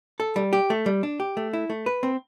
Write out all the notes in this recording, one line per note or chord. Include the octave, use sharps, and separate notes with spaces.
A4
G3
G4
A3
G3
D4
G4
A3
E4
A3
B4
C4